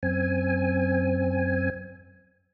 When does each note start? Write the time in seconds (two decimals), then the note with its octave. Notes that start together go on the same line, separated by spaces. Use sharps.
0.03 F#2 C4 G#5